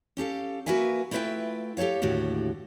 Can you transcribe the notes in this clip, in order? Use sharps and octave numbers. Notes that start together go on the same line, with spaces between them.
C#4 G4 A4 F5
A#3 F#4 A#4 B4 E5 G#5
A3 E4 F4 B4 E5 G5
G4 A4 C5 C#5 F5
D#2 A2 D3 F#4 G4